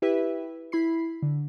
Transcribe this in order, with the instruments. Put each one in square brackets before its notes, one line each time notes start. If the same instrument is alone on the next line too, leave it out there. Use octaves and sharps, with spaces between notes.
[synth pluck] E4 G4 B4 E5
E4 B5 C7
D3